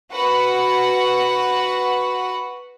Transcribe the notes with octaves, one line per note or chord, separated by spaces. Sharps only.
F#4 B4 F#5